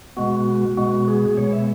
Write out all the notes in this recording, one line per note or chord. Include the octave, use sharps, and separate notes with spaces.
B2 G#3 B3 F#4
B2 G#3 B3 F#4
G#4
B2 G#3 B3 C#5
E5